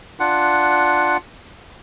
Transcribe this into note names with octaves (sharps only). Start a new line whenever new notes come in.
D4 F4 F#5